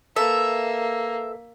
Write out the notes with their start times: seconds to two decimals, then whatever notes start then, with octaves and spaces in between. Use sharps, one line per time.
0.16 A#3 A4 B4 E5